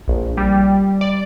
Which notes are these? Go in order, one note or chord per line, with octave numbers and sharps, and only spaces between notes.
A#1
G3
D5